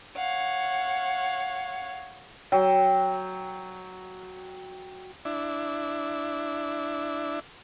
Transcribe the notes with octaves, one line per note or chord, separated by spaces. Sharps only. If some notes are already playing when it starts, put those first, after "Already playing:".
C#5 F5 F#5
F#3 G5
D4 E4